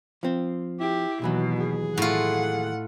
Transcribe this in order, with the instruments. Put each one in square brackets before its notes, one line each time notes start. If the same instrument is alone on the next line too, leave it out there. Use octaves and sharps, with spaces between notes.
[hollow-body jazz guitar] F3 C4
[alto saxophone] E4 [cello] G4
[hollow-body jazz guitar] D#2 E3 F#3 [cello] B2
[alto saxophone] G#4
[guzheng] A2 F4 [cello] F#5